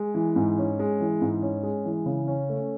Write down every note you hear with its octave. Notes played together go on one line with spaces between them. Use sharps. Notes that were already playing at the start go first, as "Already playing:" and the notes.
Already playing: G#3
E3
G#2
C#4
G#3
E3
G#2
C#4
G#3
E3
C#3
C#4
A3